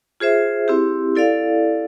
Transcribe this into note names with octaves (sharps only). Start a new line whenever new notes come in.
F4 G#4 C5 E5
C4 E4 G4
E4 A4 D5 F5